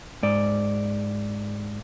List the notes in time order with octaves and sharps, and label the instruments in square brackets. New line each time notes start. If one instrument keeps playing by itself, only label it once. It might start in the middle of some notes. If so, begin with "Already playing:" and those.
[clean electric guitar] G#2 D5